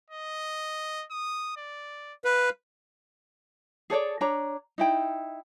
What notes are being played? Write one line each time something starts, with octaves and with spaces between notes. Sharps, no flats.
D#5
D#6
D5
B4 F5
G#4 A4 C#5 D5
D4 C#5 A#5
D#4 E4 G5